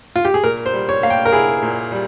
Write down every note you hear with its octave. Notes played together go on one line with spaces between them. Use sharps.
F4
G4
G#4
A#2 A#4
C5
G3
C#5
A#3 F5
G5
A#4
E4 G#4
A#2
G3